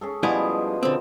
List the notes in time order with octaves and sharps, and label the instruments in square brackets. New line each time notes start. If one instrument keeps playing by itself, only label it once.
[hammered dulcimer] C#4 G#4 A4
[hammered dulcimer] B2 F3 D#5 [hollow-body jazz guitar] G3 E4 G#4
[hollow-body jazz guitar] D3 C4